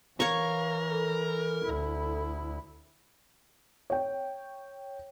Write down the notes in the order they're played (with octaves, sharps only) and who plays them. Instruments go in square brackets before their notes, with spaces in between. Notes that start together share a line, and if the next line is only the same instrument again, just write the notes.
[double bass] E3 [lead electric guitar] A#4 [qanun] C#5 C#6 [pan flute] F5
[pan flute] A4
[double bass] D2 E4
[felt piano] C#5 G5